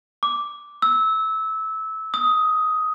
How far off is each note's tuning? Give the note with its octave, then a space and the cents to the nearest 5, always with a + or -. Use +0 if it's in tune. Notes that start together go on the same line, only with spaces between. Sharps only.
D6 -5
E6 -20
D#6 +10